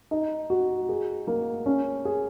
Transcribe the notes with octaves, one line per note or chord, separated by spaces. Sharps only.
D#4
F#4
G#4
A#3
C#4
G#4